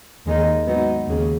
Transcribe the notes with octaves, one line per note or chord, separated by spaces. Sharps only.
D#2 D#3 G#3 D#4
G#2 F#3 B3 D#4
D#2 C#3